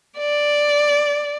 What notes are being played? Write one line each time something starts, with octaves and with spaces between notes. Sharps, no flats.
D5